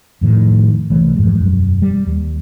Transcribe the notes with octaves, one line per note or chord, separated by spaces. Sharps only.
F2 A2 D#3
C2 E3 A3
F2 G#2
E1 F#2
G3
D#2